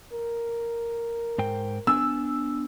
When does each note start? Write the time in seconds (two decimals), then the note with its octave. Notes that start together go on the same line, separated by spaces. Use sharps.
0.13 A#4
1.38 G#2 C5 G5
1.87 B3 D4 G#5 E6